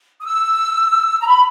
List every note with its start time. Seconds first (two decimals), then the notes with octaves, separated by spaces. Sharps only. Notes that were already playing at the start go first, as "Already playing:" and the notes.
0.20 D#6
0.25 E6
1.20 A#5
1.27 B5